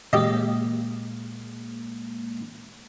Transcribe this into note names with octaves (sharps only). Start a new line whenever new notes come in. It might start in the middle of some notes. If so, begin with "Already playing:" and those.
A#2 G#3 A#3 G4 D#5